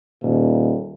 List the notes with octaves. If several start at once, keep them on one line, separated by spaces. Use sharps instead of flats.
D#1